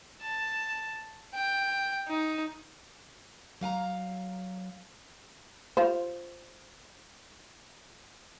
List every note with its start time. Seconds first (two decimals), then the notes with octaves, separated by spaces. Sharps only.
0.21 A5
1.34 G5
2.07 D#4
3.61 F#3 F5 G#5 A#5
5.77 F4 C5